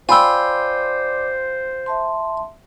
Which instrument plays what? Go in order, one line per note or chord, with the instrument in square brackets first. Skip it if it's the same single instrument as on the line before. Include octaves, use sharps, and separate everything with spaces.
[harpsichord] F4 G5 [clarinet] C5 [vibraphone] D5 D6 [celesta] G#5 B5 E6
[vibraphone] E5 A5 C6